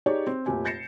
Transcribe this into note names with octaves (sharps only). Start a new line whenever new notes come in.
D#4 G4 G#4 C#5 D5
C4
F1 A#2 G4 G#5
G6 A6 A#6 C7 C#7 E7